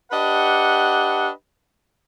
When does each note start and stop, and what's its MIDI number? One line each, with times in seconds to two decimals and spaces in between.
0.12 1.30 62
0.12 1.30 67
0.12 1.30 71
0.12 1.30 75
0.12 1.30 78